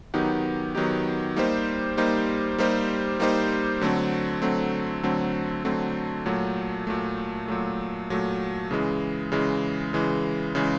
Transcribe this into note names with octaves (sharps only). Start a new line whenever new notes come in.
D#3 F#3 B3 D#4 G4
D#3 F#3 B3 D#4 G4
G3 A#3 D#4 G4 C5
G3 A#3 D#4 G4 C5
G3 A#3 D#4 G4 C5
G3 A#3 D#4 G4 C5
D3 F#3 A3 C4
D3 F#3 A3 C4
D3 F#3 A3 C4
D3 F#3 A3 C4
A#2 F#3 A3
A#2 F#3 A3
A#2 F#3 A3
A#2 F#3 A3
C#3 E3 G#3
C#3 E3 G#3
C#3 E3 G#3
C#3 E3 G#3